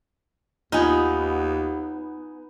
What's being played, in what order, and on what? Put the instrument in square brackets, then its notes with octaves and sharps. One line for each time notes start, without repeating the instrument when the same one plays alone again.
[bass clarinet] D#2 [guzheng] B3 D#4 [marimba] F4 D#5 G6 [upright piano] G#5 D#6